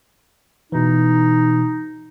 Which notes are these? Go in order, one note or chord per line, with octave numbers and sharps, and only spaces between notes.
B2 E3 D#4